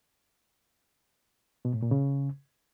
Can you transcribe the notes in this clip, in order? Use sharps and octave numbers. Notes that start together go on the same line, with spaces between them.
B2
A2
A#2
C#3